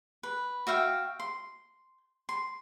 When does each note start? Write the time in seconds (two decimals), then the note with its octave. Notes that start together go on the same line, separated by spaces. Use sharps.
0.23 B4
0.67 F#4 E5 F5 G5
1.20 C6
2.29 C6